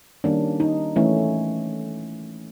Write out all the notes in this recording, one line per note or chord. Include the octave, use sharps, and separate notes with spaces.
D#3 G3 A#3 C#4 D4
D#4
E3 A3 C#4